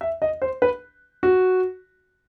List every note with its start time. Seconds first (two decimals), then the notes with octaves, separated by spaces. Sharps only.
0.01 E5
0.22 D#5
0.42 C5
0.62 B4
1.23 F#4